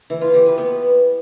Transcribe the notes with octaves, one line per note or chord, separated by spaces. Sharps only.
E3
F4
E3 G4
B4
B3